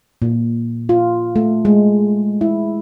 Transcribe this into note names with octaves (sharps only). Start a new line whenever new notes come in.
A#2
F4
A3
G#3
E4